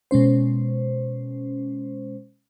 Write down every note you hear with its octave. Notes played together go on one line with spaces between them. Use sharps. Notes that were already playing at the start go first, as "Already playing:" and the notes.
B2 G#3 C#4 C5